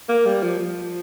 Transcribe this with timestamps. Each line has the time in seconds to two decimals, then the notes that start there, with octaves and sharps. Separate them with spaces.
0.09 A#3
0.26 G3
0.43 F3
0.59 F3